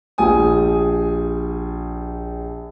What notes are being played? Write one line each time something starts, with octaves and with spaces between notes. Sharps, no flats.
A#1 F4 G4 G#5 D#6